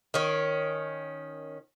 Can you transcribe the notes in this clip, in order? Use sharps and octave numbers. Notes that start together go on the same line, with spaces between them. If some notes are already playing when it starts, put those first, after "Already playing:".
D#3 C#4